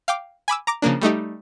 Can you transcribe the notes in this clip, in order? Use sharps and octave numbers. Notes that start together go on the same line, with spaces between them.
F5 G5 D6
G#5 B5 D6 E6
A#5 D6 A#6
C#3 F3 A#3 D4
G3 A3 D#4 G4